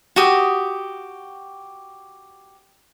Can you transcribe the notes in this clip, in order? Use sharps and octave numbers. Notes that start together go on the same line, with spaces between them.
F#4 G4 D#6